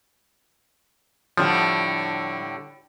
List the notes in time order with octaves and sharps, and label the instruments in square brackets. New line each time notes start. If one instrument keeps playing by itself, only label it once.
[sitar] A2 D3 G3 [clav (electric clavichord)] F3